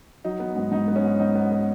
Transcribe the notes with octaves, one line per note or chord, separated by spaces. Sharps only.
F#3 D#4
B3
G#2
G#2 D#4
B3
C#4
G#2
G#2 D#4
B3
B3